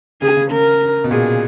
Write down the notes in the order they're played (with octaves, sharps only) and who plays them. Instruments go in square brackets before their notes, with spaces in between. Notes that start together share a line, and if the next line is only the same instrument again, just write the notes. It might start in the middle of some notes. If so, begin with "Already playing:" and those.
[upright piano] C#3 [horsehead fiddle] G#4
[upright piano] C#3
[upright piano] C#3 [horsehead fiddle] A#4
[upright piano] B2
[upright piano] A#2 [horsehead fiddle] G#4